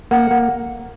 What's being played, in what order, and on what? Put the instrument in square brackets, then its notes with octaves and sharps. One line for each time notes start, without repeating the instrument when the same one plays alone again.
[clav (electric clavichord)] A#3 [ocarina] F#5
[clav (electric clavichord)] A#3